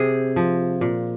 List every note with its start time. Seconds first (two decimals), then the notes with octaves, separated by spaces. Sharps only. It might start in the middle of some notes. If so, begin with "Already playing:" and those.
Already playing: C3 G#4
0.36 F3
0.81 A#2